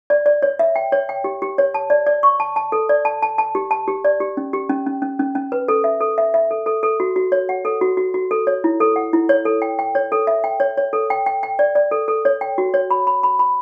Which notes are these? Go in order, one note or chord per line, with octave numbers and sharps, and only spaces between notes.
D5
D5
C#5
E5
G5
C#5
G5
G4
G4
C#5
A5
D5
D5
C#6
A5
A5
A4
D5
A5
A5
A5
G4
A5
G4
D5
G4
C#4
G4
C#4
C#4
C#4
C#4
C#4
B4
A4
E5
A4
E5
E5
A4
A4
A4
F#4
F#4
C#5
F#5
A4
F#4
F#4
F#4
A4
C#5
E4
A4
F#5
E4
C#5
A4
G5
G5
C#5
A4
E5
G5
C#5
C#5
A4
G5
G5
G5
D5
D5
A4
A4
C#5
G5
F#4
C#5
B5
B5
B5
B5